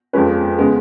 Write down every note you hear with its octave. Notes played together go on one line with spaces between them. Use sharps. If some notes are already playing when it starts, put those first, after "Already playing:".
F2 F3 G#3 C#4 B4
C#3 G#3 B3